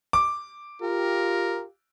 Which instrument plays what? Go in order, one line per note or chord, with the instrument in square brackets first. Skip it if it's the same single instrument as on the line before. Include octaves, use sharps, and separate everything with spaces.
[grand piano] D6
[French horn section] F4 G4 [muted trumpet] A#4